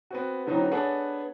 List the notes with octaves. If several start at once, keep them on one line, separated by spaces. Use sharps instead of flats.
B3 C4 F#4
D3 E3 F#3 C4 D#4
B3 D4 G#4 A4 C#5 F#5